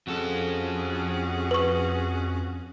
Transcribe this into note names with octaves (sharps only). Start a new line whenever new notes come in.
F2 C#4 F#4 G#4 A4
B4 C#6